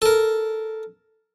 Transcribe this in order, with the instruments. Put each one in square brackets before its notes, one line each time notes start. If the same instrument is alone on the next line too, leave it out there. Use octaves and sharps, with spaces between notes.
[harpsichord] A4 A#4